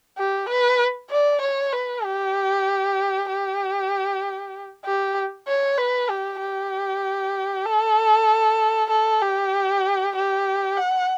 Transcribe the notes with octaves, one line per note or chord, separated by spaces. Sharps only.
G4
B4
D5
C#5
B4
G4
G4
G4
C#5
B4
G4
G4
A4
A4
G4
G4
F#5